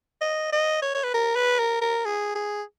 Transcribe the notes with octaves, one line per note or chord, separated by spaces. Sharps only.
D#5
D#5
C#5
C#5
B4
A#4
B4
A#4
A#4
G#4
G#4